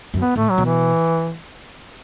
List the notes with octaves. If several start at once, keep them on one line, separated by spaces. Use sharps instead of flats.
F#2
B3
A2 A3
F#3
B2
E3